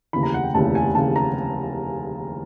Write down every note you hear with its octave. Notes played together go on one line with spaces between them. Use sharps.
F1 D#2 C#3 E3 B5
A#5
F#5
G5
F1 D#2 C#3 E3 A5
G#5
F1 D#2 C#3 E3 A5
A#5